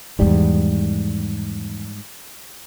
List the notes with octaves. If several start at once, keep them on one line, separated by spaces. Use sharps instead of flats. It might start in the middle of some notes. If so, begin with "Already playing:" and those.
E2 G#2 D#3 G3